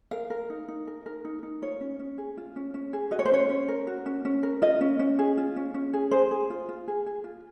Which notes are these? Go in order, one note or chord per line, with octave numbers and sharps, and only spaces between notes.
A#4 F5
A#4
D#4
D#4
A#4
A#4
D#4
D#4
F4 C#5
C#4
C#4
G#4
F4
C#4
C#4
G#4
F#4 D#5
C#5
C5
C#4 C#5
C#4
A#4
F#4
C#4
C#4
A#4
F4 D#5
C#4
C#4
G#4
F4
C#4
C#4
G#4
G#4 C5
G#4
F4
F4
G#4
G#4
F4